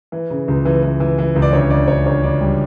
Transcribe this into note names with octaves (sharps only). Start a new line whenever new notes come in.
E3
C#3
C#2
E3
E3
E3
E3
C#2
D5
D2 C#5
D2 D5
D3 C#5
D2 C#5
D2 D5
G3